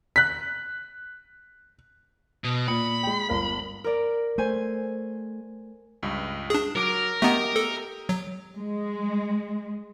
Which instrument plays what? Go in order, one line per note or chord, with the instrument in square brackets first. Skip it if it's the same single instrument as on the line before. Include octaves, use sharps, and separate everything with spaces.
[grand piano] F#6 B6
[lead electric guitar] B2
[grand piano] A#2 D#6 C#7 [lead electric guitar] B5
[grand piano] G#3 G5
G1 A#4 F5
[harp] A#4 D5
[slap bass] A3 [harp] C5 G#5
[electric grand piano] C#2 G2
[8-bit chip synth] D4 G#4
[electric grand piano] F#3 D6 D7 [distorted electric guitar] A#4
[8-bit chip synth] A3 B3 [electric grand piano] G4 D#5 A#5
[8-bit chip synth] A4
F#3
[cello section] G#3